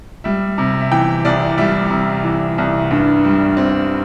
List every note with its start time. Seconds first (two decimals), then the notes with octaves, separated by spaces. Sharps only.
0.24 G3 E5
0.58 C3
0.81 E5
0.92 E3 G5
1.25 C2 D5
1.58 G3 E5
1.91 C3
2.24 E3
2.58 C2
2.91 G2
3.25 G3
3.57 C4